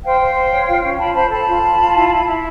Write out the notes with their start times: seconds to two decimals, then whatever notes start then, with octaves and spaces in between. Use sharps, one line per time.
0.04 C5 F5 G5
0.20 C5
0.35 C5
0.51 C#5
0.67 F4
0.83 C#4
0.99 F4 A5 B5
1.15 C5 A5 B5
1.30 A4 A5 B5
1.48 F4
1.62 F4
1.78 F4
1.95 E4
2.11 E4
2.26 E4